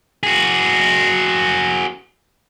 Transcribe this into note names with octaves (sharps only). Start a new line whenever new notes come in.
F#4 G#4